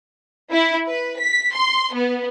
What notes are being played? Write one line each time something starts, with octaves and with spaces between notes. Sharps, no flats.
E4
B4
B6
C6
B3